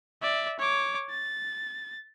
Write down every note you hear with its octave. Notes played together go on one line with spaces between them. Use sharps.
D5 E5
C#5 D6
A6